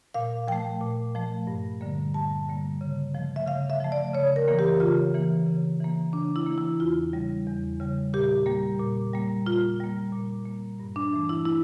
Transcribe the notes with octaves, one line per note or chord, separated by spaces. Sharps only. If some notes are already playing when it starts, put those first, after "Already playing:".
A#2 F5
F3 A3 G5
A#2
F3 A3
G2
D3 G3 A#3
G2 A5
D3 G3 A#3
C#3
F3 A3
E5
C#3 F5
E5
F3 A3
D5
C#3 C#5
A#4
E3 A#3
G4
C#3 F4
E3 A#3
C#3
E3 A#3
C#3 D4
E4
E3 A#3
E4
E2 F4
C#3 G3
E2
C#3 G3
A#2 G4
G3 A#3
A#2
G3 A#3
A#2 F4
G3 A#3
A#2
G3 A#3
G2
D4
E3 A3
E4
E4